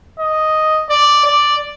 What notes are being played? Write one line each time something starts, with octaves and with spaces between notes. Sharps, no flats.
D#5
D5
D5